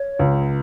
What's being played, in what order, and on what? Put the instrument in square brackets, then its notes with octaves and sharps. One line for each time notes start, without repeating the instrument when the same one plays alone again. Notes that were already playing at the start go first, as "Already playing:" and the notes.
Already playing: [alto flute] C#5
[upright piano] C#2